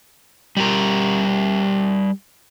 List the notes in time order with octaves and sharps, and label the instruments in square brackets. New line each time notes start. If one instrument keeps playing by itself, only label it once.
[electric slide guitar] G3 G4 A#4